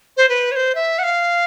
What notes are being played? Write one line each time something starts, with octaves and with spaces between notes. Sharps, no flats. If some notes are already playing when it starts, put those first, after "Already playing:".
C5
B4
C#5
C5
E5
F#5
F5